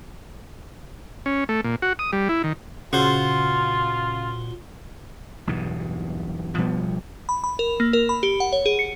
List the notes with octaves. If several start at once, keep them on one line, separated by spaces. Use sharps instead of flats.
C#4
A3
A#2
F#4
D#6
G3
E4
D#3
A#2 C#3 F4 F#4 C5
B1 E2 G2 B2
B2 F3 G3 B3
B5
B5
A#4
A#3
A#4
B5
G4
F#5
C#5
G#4
C#7